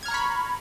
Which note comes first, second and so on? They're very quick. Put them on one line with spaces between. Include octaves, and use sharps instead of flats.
G#6 F6 A#5 C#6 B5